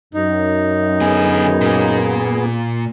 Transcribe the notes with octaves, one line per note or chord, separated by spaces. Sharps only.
F#2 D#4
D3 B3 G#4 G#5
A#2